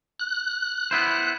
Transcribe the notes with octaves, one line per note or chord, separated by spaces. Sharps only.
F#6
B3 E4 C5